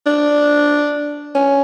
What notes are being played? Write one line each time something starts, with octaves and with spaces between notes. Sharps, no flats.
D4
C#4